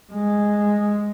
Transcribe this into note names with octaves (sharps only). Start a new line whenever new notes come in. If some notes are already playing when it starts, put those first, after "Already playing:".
G#3